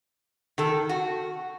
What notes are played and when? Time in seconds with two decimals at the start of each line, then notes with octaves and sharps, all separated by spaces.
0.58 D#3 A4
0.89 F#4